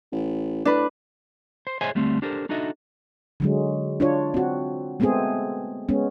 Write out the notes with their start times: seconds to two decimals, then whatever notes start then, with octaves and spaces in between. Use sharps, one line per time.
0.12 A1
0.65 A2 D4 B4
1.67 C5
1.81 G#4 C5 C#5 D#5 E5 G#5
1.95 D2 G3 A3 C4
2.22 D4 G4 A4 A#4 C5
2.49 D4 D#4 F#4 A4 D#5 E5
3.40 D3 F#3 G#3
4.00 D4 F4 C#5
4.34 C4 F#4
5.00 G#3 A3 B3 C4 G#4
5.89 G#3 B3 C#4